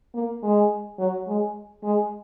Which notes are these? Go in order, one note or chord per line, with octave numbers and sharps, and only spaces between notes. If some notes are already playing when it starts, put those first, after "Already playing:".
A#3
G#3
F#3
G#3
G#3